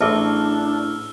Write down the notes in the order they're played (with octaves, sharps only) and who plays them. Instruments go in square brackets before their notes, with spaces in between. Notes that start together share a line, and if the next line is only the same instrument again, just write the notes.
[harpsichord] A1 [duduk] D4 [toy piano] G#4 E5 A5 [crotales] E6 F6